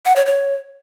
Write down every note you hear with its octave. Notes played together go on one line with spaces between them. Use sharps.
F#5
C#5
C#5